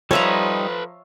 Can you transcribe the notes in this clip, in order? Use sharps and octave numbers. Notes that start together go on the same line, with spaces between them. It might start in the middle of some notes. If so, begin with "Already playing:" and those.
F3 G3 D#4 A4 B4 C#5 E5 A#5